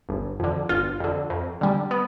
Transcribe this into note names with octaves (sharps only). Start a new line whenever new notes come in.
G1
F2 D3
G1 F4
F2 D3
F2
D3 G3
B3